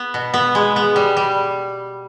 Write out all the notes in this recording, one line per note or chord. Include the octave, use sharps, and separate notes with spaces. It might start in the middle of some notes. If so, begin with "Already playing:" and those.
Already playing: B3
B2
B3
G#3
B3
G3
G3